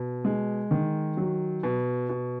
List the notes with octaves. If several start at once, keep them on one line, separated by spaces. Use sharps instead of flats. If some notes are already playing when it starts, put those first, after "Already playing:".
Already playing: B2
G#3
D#3
F#3
B2
B2